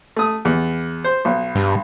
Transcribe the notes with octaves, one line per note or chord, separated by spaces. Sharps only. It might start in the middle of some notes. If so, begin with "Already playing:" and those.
A3 D#6
E2
C5
B1
G2